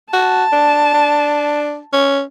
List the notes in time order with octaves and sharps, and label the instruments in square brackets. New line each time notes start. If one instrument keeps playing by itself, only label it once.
[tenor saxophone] F#4 [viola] A5
[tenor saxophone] D4
D4
C#4